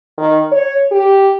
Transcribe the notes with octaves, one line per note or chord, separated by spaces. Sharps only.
D#3
C#5
G4